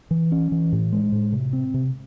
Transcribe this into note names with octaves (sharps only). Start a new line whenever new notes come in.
E3
C#4
E3
A2
G#3
A2
C3
C4
C3